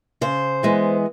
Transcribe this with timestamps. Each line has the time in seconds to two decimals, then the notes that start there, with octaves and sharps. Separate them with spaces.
0.21 C#3 C5
0.63 E3 G#3 B3